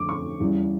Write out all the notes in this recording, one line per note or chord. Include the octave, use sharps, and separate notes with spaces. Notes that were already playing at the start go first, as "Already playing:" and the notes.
Already playing: F2 D3 A3 D6
C#6
E2 C#3 G3